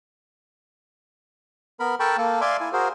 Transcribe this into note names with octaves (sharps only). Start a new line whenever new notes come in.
B3 A#4 B5
A4 A#4 G5 A5 B5 C#6
A#3 A4
D5 E5 F5 G#5 C6 D6
E4 G#5
F#4 G#4 A#4 C5